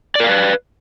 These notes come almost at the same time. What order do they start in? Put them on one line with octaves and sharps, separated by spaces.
D5 A#4 F5 B4